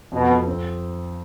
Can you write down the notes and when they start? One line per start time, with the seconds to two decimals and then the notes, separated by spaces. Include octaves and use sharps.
0.12 F2 B2
0.29 F2
0.47 C4